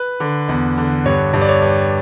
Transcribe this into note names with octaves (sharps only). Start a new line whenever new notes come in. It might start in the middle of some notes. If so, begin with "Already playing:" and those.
Already playing: B4
D3
E2
D3
G2 C#5
G2
D5
C#5
G2